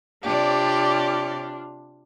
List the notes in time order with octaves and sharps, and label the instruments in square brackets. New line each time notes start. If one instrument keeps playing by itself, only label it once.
[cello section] C3 C#5 D5 [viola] D4 F4 [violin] G4